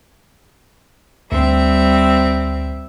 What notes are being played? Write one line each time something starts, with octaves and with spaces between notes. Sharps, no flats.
D2 G3 C4 E5